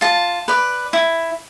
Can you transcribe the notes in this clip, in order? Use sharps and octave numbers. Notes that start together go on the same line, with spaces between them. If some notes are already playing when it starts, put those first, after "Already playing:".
F4 A5
B4 D5
E4